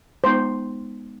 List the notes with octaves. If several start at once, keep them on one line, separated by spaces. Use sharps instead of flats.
G#3 B3 D#4 C5